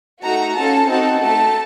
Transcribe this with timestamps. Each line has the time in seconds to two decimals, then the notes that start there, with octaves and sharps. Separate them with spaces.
0.23 A3 D#4 F#4 A#5
0.56 C#4 F4 A4 A5
0.88 C4 D#4 F#4 A4 A5
1.21 A3 D#4 A4 A5